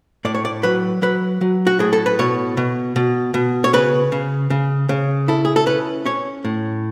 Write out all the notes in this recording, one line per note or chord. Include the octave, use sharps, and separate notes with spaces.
A2 D5
C#5
D5
F#3 B4
F#3 B4
F#3
F#4
A2 G#4
A4
B4
B2 C#5
B2
B2
B2
C#5
C#3 B4
C#3
C#3
C#3
E4 A4
G#4
A4
C#4 B4
C#4 C#5
A2